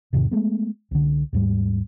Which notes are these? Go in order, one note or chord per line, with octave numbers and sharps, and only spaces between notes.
E2 G#2 C3 D#3
G#3 A3 B3
C2 D3
D#2 G#2 G3